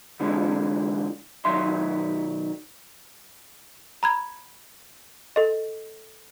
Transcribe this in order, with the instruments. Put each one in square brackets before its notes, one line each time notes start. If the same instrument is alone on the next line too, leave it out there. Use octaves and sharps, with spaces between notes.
[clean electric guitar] F2 D3 E3 G#3
B1 D#3 F#3 E5 C6
[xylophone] A#5 B5 G#6
A4 D#5